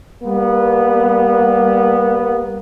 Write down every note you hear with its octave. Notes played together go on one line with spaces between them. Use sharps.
G3 A#3 B3